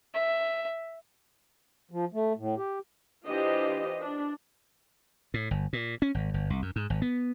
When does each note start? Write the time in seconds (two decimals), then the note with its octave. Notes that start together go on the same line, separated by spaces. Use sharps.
0.15 E5
1.91 F3
2.14 A3
2.37 A2
2.57 G4
3.26 E3 D4 F4 G4 C5 D#5
4.00 D4
5.34 A2
5.51 G1
5.73 A#2
6.02 C#4
6.14 G#1
6.34 G1
6.50 C2
6.62 F#2
6.76 G#2
6.90 G#1
7.02 B3